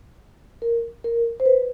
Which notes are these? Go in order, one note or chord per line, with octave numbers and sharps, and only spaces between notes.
A#4
A#4
C5
B4